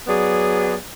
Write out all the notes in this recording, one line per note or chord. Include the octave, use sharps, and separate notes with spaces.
F#3 B3 G#4 D5